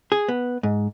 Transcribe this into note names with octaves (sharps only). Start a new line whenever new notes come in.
G#4
B3
G#2